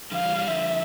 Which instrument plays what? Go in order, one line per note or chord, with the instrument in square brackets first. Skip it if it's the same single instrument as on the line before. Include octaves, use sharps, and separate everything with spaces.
[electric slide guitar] D3 F3 [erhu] F5
[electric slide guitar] E3 G3
E3 G3
[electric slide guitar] D3 F3 [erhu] E5